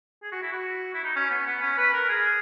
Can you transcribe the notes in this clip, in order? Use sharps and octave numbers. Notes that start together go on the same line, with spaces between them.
G#4
F#4
E4
F#4
E4
D#4
C#4
B3
B3
C#4
B4
A#4
G#4